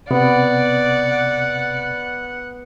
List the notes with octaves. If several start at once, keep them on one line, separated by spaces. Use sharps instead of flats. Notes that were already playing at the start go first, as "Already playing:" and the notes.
C3 B3 D5 F#5